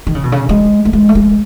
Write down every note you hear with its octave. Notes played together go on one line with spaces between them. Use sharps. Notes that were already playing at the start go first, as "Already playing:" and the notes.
D#3
C#3
B2
C#3
G#3
A3
G#3
A3
G#3